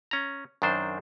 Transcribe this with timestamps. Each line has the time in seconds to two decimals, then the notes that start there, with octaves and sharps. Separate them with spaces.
0.11 C#4 A#5
0.62 F#2 D#3 D4 C5